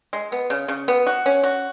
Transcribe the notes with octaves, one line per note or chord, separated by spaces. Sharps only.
G#3
B3
C#3
C#3
B3
F#4
C#4
F#4